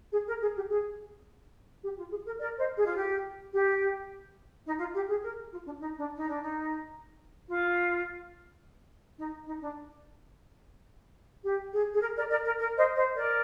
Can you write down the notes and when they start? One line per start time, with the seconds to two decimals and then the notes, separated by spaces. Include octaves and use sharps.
0.12 G#4
0.27 A#4
0.41 G#4
0.55 G4
0.69 G#4
1.82 G4
1.97 F4
2.10 G#4
2.25 A#4
2.39 A#4 D5
2.58 C5 D#5
2.77 G#4
2.86 F4
2.95 G4
3.52 G4
4.66 D#4
4.79 F4
4.94 G4
5.08 G#4
5.22 A#4
5.51 F4
5.64 D4
5.78 D#4
5.97 D4
6.16 D#4
6.29 D4
6.42 D#4
7.48 F4
9.18 D#4
9.46 D#4
9.60 D4
11.44 G4
11.73 G#4
11.94 G#4
12.01 A#4
12.16 A#4 D5
12.29 A#4 D5
12.44 A#4
12.58 A#4
12.76 C5 D#5
12.95 C5 D#5
13.14 A#4 D5